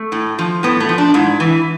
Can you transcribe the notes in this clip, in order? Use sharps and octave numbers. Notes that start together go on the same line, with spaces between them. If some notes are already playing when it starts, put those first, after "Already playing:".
Already playing: A3
A2
F3
A2 B3
A3
F3
D4
G#2 E4
E3